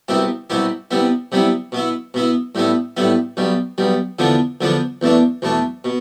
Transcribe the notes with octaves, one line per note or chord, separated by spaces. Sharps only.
C2 B2 B3 E4 G4
C2 B2 B3 E4 G4
C3 G3 B3 E4
C3 G3 B3 E4
B2 B3 E4
B2 B3 E4
A2 G3 B3 E4
A2 G3 B3 E4
B1 B2 G3
B1 B2 G3
E2 D3 F3 B3 D4
E2 D3 F3 B3 D4
E2 B2 A3 D4
E2 B2 A3 D4
B2